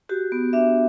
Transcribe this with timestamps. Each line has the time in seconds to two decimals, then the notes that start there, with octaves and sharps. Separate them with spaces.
0.09 F#4 G4
0.32 B3
0.53 D4 E5